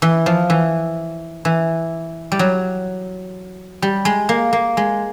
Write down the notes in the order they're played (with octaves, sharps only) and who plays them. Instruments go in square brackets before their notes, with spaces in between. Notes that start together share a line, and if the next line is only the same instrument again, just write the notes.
[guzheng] E3
F3
E3
E3
G3
F#3
G3
G#3
A#3
A#3
G#3